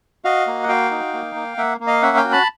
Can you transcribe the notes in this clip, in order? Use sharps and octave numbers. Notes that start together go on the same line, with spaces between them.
F#4 D#5 F5
A#3
F#5
F#4 F5 G5
D#4
A#3
A#3
A#3 E5 F#5
A#3
D#5 F5
C#4 E5 F#5
F5 G5
F#4
A5 B5